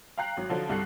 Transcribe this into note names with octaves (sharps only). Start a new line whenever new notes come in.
F5 G5 A#5 F#6 C7
G#1 F#3
D3 F3 F#3
C2 G2 A4 F#5 F#6 C7